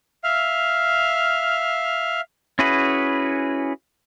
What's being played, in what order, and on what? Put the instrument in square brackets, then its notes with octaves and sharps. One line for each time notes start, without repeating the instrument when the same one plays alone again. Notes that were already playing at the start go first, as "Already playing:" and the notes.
[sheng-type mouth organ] E5 F5 F6
[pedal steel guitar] C#4 E4 F#4 G#4 B4